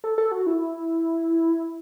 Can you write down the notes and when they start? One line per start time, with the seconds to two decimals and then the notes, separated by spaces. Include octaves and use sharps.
0.04 A4
0.18 A4
0.32 F#4
0.47 E4